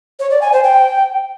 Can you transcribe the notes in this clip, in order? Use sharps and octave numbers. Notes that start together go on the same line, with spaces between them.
C#5
D5
G#5
C5
G5